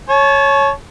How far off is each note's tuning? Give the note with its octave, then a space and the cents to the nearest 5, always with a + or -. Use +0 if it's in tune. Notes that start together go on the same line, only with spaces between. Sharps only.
C#5 +0 A5 -35